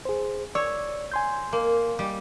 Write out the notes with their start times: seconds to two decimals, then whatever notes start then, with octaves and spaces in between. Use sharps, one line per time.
0.05 G#4 C5
0.55 C#5 D5 E6
1.12 G#5 C6 G6
1.53 A#3
1.99 G3